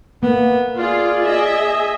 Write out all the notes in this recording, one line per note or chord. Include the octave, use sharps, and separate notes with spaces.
A#3 B3
F4 G#4 D5
D#5 E5